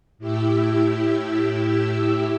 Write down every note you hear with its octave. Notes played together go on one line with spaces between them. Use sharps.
A2 E4 G4 E6